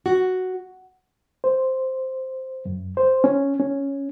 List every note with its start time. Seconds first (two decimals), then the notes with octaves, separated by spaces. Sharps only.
0.06 F#4
1.44 C5
2.65 F#2
2.97 C5
3.24 C#4
3.59 C#4